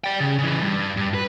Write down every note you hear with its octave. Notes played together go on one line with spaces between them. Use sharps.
D5 G5
C#3
C#3 E3
G2
G2
B4